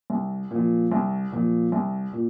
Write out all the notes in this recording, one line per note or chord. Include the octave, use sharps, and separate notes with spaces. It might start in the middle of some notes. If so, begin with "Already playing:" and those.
C2
A#2 F3
C2
A#2 F3
C2
A#2